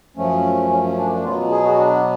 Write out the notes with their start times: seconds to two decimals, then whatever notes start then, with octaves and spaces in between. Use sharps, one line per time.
0.17 F#2 F3 A3 C#4
0.70 C#4
0.84 C#4
0.97 D4
1.11 D4
1.24 B2 F#3 B3 F4
1.50 G#4
1.64 F#4
1.78 D4